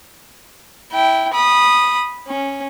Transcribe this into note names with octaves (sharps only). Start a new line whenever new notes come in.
E4 G5
B5 D#6
C#4